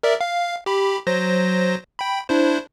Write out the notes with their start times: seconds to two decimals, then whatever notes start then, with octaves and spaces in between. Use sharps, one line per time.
0.03 A#4 D5 E5
0.21 F5
0.66 G4 B5
1.07 F#3 C5 A#6
1.99 G5 B5
2.29 D4 E4 C5